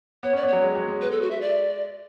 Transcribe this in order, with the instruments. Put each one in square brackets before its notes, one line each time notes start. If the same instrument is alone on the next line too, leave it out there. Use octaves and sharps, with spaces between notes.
[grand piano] B3 [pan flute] C#5
[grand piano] C#4 [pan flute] D5
[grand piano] B3 [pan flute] C#5
[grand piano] F#3
G#3
F#3
G#3
[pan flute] B4
A4
F#4
E5
D5